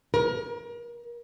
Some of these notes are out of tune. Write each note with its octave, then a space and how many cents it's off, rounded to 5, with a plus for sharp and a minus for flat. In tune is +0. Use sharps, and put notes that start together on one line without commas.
A#4 +30